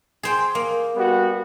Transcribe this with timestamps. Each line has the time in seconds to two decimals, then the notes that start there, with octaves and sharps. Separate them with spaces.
0.23 G#4 C5 G5
0.55 A#3
0.97 G3 B3 F#4